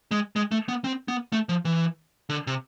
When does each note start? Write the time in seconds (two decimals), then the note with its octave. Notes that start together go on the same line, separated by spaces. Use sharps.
0.11 G#3
0.36 G#3
0.52 A3
0.69 B3
0.84 C4
1.08 B3
1.33 A3
1.49 F3
1.65 E3
2.29 D3
2.47 C3